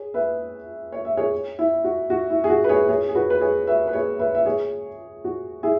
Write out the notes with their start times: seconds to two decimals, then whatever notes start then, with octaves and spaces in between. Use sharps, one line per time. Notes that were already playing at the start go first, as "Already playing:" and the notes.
Already playing: G#4 C#5
0.14 B4 E5
0.92 C#5
1.05 E5
1.17 G#4 C#5
1.59 E4
1.84 F#4
2.10 F#4
2.30 E4
2.44 G#4
2.50 F#4
2.64 B4
2.69 G#4 C#5
2.89 G#4 C#5
3.08 G#4
3.15 F#4 B4
3.30 B4
3.41 G#4 C#5
3.67 B4 E5
3.87 B4
3.93 G#4 C#5
4.19 B4 E5
4.35 E5
4.45 G#4 C#5
5.24 F#4
5.63 E4 G#4